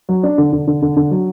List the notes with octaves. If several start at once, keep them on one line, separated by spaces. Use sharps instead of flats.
F#3
D4
D3
D3
D3
D3
D3
F#3